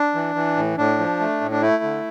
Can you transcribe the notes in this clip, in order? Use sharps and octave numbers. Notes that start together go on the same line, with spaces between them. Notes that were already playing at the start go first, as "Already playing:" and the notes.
Already playing: D4
E3
E3
A2
A2 D4
F3
A3
A2
D4
A3 E4
D3